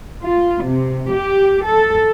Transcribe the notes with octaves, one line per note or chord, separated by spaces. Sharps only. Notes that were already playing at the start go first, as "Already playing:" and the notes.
F4
C3
G4
A4